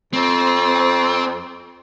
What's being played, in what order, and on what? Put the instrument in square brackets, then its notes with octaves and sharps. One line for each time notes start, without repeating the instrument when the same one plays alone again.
[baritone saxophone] F2 [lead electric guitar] C4